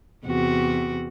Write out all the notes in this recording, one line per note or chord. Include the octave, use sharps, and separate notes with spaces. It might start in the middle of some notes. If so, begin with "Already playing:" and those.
E2 C3 F#4